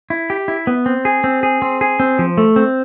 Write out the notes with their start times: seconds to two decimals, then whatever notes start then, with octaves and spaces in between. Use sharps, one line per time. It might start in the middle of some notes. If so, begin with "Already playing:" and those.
0.10 E4
0.30 G4
0.48 E4
0.67 B3
0.86 C4
1.05 G#4
1.24 C4
1.43 G#4
1.62 C4
1.81 G#4
2.00 C4
2.19 F3
2.38 A3
2.56 C4